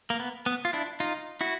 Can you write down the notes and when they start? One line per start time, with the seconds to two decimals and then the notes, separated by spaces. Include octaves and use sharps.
0.10 A#3
0.20 B3
0.46 B3
0.65 F4
0.73 D4 E4
1.00 D#4 F4
1.41 E4 F#4